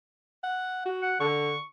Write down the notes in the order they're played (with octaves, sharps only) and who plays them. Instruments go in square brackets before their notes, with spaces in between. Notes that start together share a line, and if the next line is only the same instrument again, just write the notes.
[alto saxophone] F#5
F#4
[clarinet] F#5
[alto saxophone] D3 [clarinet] C#6